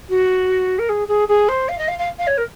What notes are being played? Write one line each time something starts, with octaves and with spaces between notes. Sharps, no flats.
F#4
A#4
G#4
G#4
G#4
C5
F5
D#5
F5
F5
F5
C#5
A#4